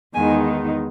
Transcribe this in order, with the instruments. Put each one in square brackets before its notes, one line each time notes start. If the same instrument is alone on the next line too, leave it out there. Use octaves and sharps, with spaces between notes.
[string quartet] E2 D#3 G#3 B3 D#4 G#5